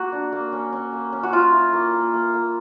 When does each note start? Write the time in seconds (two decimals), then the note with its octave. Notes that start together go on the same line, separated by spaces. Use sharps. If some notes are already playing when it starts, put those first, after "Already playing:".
Already playing: A#3 F#4
0.13 D4
0.32 A#3
0.52 C#4
0.73 C#4
0.93 A#3
1.13 C#4
1.23 F#4
1.33 C#4 F4
1.53 E4
1.73 A#3
1.93 A#3
2.14 A#3
2.34 A#3